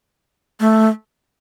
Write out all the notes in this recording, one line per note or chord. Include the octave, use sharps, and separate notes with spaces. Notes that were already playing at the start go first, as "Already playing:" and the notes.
A3